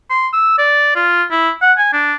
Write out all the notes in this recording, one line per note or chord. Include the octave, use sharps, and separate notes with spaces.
C6
E6
D5
F4
E4
F#5
G#5
D4